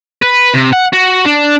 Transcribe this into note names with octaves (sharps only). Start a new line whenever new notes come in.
B4
C3
F#5
F#4
D4